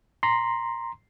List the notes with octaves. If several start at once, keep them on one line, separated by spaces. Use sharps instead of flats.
A#5 C6